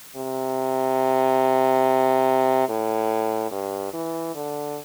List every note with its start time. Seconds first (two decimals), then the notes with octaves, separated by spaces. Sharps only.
0.17 C3
2.69 A2
3.52 G2
3.93 E3
4.35 D3